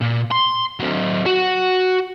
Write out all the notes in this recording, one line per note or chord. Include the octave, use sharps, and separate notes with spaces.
A#2
C6
F#3 C4
F#4 F#5